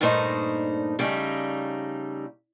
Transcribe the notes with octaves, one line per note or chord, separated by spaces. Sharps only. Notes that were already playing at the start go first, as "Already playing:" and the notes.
G2 A#2 A3 D#4 C5 D#5
C#3 G3 A3 D#4